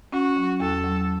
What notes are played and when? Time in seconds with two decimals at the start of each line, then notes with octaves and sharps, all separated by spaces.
0.12 C#4 F#4
0.37 F#3
0.60 E2 A4
0.84 F#3